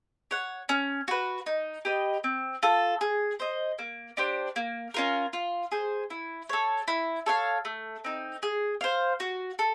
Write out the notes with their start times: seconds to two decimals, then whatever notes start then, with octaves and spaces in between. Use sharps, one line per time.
0.31 C#5 F#5
0.69 C#4
1.08 F#4 B4
1.46 D#4
1.85 G4 B4 D#5
2.24 C4
2.63 F4 A4
3.01 G#4
3.40 C5 D#5
3.79 A#3
4.17 D4 G4 C5
4.56 A#3
4.94 C#4 F4 A#4
5.33 F4
5.72 G#4 C5
6.10 E4
6.49 A4 C#5
6.88 E4
7.26 A4 C#5 F5
7.65 A3
8.05 C4 D#4
8.43 G#4
8.81 C5 F5
9.20 F#4
9.59 A4